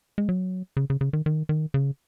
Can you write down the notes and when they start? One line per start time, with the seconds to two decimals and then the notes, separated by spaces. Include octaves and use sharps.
0.18 G#3
0.29 F#3
0.77 C#3
0.90 C#3
1.01 C#3
1.13 D#3
1.26 D#3
1.49 D#3
1.74 C#3